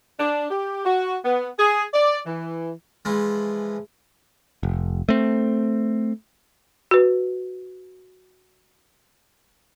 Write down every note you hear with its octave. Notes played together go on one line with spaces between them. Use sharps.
D4
G4
F#4
B3
G#4
D5
E3
E3 F3 G#3
F1
A3 C4
F#4 B4